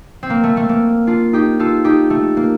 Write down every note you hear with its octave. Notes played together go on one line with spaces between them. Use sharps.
C4
A#3
A3
A3
A#3
D4 F4
D#4 G4
F4 A4
D#4 G4
A3
A#3